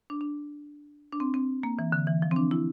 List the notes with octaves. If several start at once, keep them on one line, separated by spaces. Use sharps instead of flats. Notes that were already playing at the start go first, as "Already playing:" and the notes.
D4
D4
D4
C4
C4
A#3
E3
D3
E3
F3
C4
D4
E4